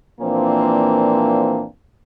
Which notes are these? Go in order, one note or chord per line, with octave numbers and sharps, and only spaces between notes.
A#2 E3 F3 A#3 C4 D4